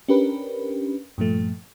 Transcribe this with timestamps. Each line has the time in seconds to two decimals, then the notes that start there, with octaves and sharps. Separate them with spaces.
0.08 C#4 D4 G4 A#4 B4
1.18 G2 A#2 F3 A3